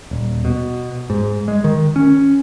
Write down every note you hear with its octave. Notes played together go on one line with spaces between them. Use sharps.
D#1
B2
G#2
G#3
D#3
C#4